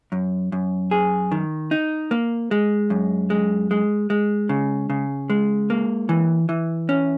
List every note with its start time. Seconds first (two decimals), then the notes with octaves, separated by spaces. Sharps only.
0.12 F#2
0.52 F#2
0.91 G#4
1.32 D#3
1.71 D#4
2.11 A#3
2.51 G#3
2.90 F#2
3.30 G#3
3.71 G#3
4.10 G#3
4.49 C#3
4.90 C#3
5.30 G#3
5.70 A#3
6.09 E3
6.49 E3
6.89 C#4